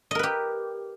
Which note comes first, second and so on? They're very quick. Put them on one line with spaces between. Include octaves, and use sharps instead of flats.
D#5 A#4 B4 G4